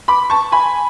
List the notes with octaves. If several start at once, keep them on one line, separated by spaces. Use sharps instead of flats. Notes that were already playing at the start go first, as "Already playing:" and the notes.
B5 D6
A5 C#6
G#5 B5